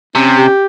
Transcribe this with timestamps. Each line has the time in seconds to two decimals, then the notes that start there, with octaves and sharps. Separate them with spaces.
0.15 C3 C#4
0.36 G4